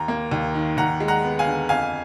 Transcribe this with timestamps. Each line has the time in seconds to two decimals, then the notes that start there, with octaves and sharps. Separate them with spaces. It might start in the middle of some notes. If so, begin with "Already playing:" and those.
Already playing: D#2 A#5
0.08 A#3
0.31 D#2
0.54 D#3
0.77 D#2 F#5 A#5
1.00 G#3
1.08 F#5 A#5
1.23 B3
1.39 F5 G#5
1.47 D3
1.69 F2 F5 G#5